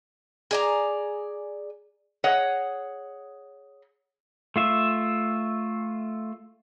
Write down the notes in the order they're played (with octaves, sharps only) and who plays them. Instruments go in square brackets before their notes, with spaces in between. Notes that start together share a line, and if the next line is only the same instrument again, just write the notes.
[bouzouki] G#4 D5 A#5
[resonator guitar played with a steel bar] G#4 C#5 D#5 F#5
[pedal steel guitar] A3 F4 E5